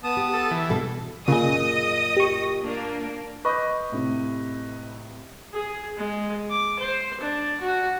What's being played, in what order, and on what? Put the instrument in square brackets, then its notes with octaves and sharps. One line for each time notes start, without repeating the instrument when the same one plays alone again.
[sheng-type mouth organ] B3 A5 D#6
[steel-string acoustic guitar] G4
[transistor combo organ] A4
E3
[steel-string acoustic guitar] G2 B2 A4
[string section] F#2 D#5 D#6 [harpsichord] A#2 [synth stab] C#3 G#4
[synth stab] G4 C#6
[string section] A#3 D4
[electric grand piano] B4 D#5 [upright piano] B5 D6 G6 [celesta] C#6
[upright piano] A2 C3
[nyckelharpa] G#4
G#3
D6
C5
D4
F#4